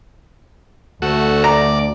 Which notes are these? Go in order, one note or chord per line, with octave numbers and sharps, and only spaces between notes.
D2 A3 F#4
D5 A#5